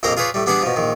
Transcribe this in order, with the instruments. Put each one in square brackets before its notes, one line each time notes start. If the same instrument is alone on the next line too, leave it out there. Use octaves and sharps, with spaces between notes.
[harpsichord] A#1 F2 A#3 C5 D#5 A#5
F4 G#4 B4 C#5 D5
A2 G3
G3 B3 D4 G#4 D5 F#5
B2 F3
A#1 D#3